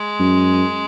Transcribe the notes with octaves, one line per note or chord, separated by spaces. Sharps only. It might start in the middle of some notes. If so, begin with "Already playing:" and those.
Already playing: G#3
F#2